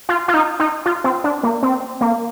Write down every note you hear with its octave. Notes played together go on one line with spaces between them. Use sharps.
F4
F4
D#4
D#4
F4
C4
D4
A#3
C4
A#3